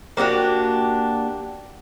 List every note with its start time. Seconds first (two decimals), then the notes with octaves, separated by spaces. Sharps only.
0.17 A#3 D4 F#4 G4